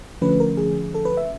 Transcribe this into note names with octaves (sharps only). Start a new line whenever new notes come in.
D3 F3 A3 C#4 B4
A#4
G#4
A4
B4
E5